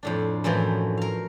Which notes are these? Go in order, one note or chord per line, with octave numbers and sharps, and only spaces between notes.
F2 A2 D4
F#2 A2 E3 F3
A#4 F5